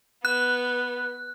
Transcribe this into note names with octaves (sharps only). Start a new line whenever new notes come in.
B3 F#6